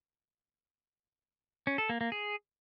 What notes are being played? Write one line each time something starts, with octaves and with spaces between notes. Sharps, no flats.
C#4
A4
A#3
A#3
G#4